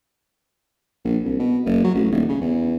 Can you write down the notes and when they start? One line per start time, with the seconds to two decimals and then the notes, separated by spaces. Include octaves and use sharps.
1.05 A#1
1.24 C2
1.39 B2
1.66 F#1
1.84 F#3
1.95 A1
2.12 D#1
2.29 C#3
2.42 E2